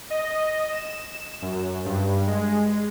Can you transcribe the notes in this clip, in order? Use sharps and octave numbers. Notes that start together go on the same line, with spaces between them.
D#5
E7
F#2
G2
G#3